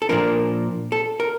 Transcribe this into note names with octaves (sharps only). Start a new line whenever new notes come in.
A4
A#2 F3 A#3 D4 A#4
A4
A#4